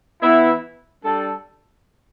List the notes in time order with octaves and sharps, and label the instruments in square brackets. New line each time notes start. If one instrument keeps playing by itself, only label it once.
[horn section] E3 B3 E4
G3 D4 A4